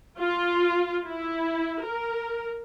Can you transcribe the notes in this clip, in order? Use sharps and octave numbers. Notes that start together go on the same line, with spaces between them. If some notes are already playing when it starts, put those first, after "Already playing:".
F4
E4
A#4